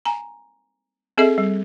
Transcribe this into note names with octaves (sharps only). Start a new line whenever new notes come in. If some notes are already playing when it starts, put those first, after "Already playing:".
G#5 A#5
C4 G#4 A4 D#5 E5
G3